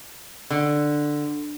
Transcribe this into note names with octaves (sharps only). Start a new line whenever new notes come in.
D3